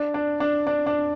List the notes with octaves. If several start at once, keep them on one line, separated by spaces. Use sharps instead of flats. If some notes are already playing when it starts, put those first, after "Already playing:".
Already playing: D4
D4
D4
D4
D4